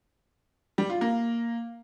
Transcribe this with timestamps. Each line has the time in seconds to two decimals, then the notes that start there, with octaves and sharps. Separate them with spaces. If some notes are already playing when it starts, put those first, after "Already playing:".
0.78 G3
0.90 F4
1.01 A#3